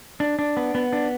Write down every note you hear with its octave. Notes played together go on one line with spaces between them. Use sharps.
D4
D4
B3
B3
D4